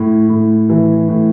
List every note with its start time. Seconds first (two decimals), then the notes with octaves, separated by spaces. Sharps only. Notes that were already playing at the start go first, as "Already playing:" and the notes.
Already playing: A2
0.30 A2
0.69 E3
1.09 A2